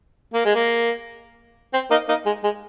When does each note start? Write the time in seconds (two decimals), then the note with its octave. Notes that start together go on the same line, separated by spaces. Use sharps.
0.34 A#3
0.45 G#3
0.55 A#3
1.73 C4
1.91 A#3 D#4
2.08 A#3 D#4
2.26 G#3
2.44 G#3